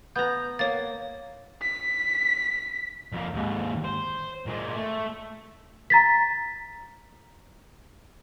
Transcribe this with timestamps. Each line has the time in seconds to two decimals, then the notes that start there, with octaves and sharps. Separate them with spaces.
0.16 B3 A#5 G6
0.59 A#3 C#5 A6
1.62 B6
3.12 F2 A#3
3.34 D#2 G#2
3.85 C5
4.47 A#2 G#3
4.76 A3
5.90 A#5 A6 B6